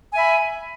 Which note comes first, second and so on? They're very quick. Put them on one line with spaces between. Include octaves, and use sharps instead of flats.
G#5 E5 B5